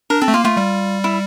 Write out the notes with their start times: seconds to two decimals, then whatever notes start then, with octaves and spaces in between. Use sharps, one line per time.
0.10 D4 A#4
0.21 C4 A4
0.28 A3
0.34 A#3 F4
0.45 A3 F4
0.57 G3
1.04 E4